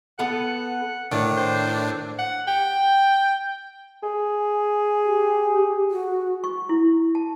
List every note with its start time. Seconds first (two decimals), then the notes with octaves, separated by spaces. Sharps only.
0.19 B3 A4 B4 F#5
1.11 A2 D#3 D4
1.37 C5
2.19 F#5
2.47 G5
4.03 G#4
5.04 G4
5.91 F#4
6.44 C#6
6.69 E4
7.15 A5